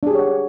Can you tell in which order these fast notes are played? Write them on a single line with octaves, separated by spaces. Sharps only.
D4 G#4 G4 C#5 F#5